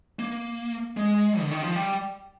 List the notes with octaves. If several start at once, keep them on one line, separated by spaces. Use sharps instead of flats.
A#3
G#3
D3
D#3
F3
G3